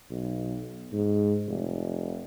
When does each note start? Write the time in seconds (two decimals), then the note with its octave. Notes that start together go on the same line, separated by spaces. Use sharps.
0.11 B1
0.92 G#2
1.47 F1